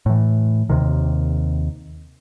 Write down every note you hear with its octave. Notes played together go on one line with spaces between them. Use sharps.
A2 E3
D#2 C3 D#3